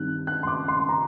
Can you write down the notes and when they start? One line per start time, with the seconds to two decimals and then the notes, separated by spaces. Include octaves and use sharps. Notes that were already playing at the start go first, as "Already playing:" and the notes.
Already playing: G2 D#3 G3 C4 F#6
0.27 F#6
0.43 C6
0.47 D6
0.68 C6
0.82 C6
0.89 A#5